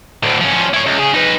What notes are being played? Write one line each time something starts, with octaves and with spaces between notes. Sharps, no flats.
D2 A2
F3 C#4
E4 C#5
C#2
C#3 G#4
D#4 B4